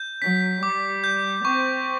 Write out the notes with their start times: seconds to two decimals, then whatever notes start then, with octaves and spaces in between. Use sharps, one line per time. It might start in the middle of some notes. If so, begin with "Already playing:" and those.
Already playing: G6
0.22 F#3 B6
0.63 G3 D6
1.04 G6
1.44 C4 C#6